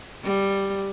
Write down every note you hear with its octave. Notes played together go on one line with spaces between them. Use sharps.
G3